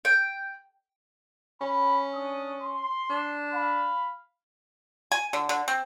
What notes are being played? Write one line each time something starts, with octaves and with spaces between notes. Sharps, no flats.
G5
C#4 B5
D4 D#6
C6
D4
F5 B5
G#5
D3
D3
C4